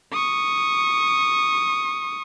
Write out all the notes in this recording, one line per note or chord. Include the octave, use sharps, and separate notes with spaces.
C#6 D#6